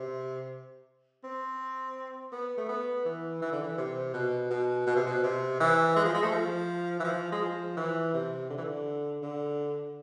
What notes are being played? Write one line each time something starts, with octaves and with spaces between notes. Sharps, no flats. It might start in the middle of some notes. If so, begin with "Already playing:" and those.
Already playing: C3
C4
B3
A3
B3
E3
E3
D3
E3
C3
B2
B2
B2
C3
B2
C3
E3
G#3
F3
G#3
A3
F3
E3
F3
G#3
F3
E3
C3
D3
E3
D3
D3